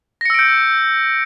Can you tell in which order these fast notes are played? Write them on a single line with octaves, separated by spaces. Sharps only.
A#6 C#7 E6 D7 G6